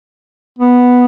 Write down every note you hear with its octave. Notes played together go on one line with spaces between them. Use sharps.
B3